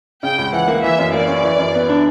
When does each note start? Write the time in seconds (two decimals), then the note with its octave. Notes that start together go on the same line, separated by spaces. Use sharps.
0.23 C#3 G5
0.38 C#2
0.53 E3 F#5
0.68 A#3
0.83 E3 E5
0.99 F#2
1.13 A#3 D5
1.28 C#4
1.44 E3
1.59 F#2
1.74 B3
1.89 D4